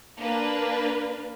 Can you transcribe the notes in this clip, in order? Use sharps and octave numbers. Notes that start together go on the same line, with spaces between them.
A#3 D4 B4